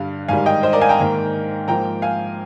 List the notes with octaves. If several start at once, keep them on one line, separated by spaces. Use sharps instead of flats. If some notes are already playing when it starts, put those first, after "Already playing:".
Already playing: G2 D3 G3 F5
G#2 D#3 G3 F5 G#5
D#5 G5
C5 D#5
A#4 D5
F5 G#5
G5 A#5
G#2 D#3 A#3
G#2 F3 A#3 G5 A#5
F5 G#5